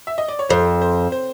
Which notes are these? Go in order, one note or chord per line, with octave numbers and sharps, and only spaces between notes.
E5
D#5
D5
C#5
F2 C5
C5
C5